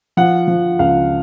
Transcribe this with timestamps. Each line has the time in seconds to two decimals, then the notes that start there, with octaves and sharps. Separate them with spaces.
0.17 F3 F#5
0.48 F3
0.79 C#2 F5